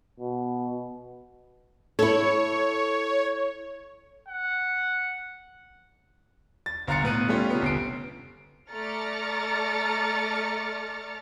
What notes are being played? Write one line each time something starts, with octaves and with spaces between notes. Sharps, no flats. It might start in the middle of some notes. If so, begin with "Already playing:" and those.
B2
E4 A4 C#5
F#5
A6
G1 F5 A#5 A6 C#7
A2 B3 F#6 D#7
G3 A3 C#4 F4
C3 B3
G1 C7 D7
A3 D5 A#5 F6 A6 C#7